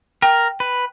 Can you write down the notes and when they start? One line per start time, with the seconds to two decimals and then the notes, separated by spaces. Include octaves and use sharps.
0.22 A#4 G5
0.60 B4